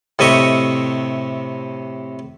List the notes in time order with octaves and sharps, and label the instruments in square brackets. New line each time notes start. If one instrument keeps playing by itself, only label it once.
[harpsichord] A2 C3 D#5 E5 C#6